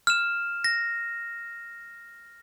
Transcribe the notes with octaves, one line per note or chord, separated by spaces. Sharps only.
F6 E7
A#6